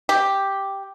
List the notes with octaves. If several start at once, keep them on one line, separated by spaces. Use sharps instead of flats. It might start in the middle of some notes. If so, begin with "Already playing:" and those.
G4